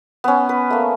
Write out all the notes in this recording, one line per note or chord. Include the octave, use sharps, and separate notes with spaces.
B3 C#4
B4
A3 A#3